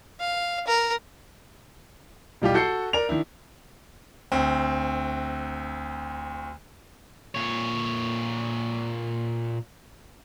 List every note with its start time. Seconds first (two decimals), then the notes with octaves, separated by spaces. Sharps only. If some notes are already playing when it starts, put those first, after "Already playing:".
0.20 F5
0.67 A#4
2.42 B1 G3 F4 G4
2.54 F#4 A4 G6 C7 C#7
2.93 A#4 D5 F7
3.09 D#3 D4 E4
4.32 D2 C4
7.35 A#2 C#5